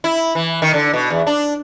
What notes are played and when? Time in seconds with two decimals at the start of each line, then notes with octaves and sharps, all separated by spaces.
0.04 E4
0.35 E3
0.62 D#3
0.74 D3
0.93 B2
1.10 E2
1.27 D4